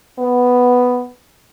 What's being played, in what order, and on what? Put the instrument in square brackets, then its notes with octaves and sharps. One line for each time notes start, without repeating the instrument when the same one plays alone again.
[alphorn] B3